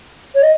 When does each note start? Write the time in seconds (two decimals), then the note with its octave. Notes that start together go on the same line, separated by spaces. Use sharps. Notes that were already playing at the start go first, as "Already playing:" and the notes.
0.35 C#5
0.42 D#5